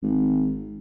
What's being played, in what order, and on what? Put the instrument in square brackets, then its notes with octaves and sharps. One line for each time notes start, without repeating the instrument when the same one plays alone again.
[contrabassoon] G#1